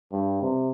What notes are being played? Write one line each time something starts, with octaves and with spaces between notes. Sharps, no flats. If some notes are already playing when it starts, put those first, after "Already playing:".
G2
C3